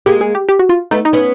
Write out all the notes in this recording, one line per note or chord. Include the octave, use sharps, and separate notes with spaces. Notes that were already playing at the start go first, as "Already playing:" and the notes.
G#3 A#3 G4
G#4
G4
G4
F#4
F4
A3 B3 D#4
D#4
B3 C#4